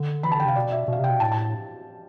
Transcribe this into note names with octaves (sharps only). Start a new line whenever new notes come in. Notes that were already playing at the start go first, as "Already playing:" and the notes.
Already playing: D3
E3 B5
A5
D3 G5
C3 F5
B2 D5
E5
B2 F5
C3 G5
B2
A2 A5
A5